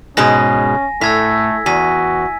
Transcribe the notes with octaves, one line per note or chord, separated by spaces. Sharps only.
G#2 B2 G#3 C#4 G#5 A#6
A2 A3 E6 G#6 B6
E2 F#4 G#5 B6